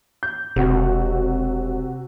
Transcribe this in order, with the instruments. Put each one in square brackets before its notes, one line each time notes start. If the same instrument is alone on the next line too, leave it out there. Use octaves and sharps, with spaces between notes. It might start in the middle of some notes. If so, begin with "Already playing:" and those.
[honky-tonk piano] G6
[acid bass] E1 [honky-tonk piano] C3 F#4